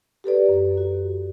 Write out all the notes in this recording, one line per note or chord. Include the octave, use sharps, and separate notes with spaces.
G4 A4 B4 D5
F#2
F#4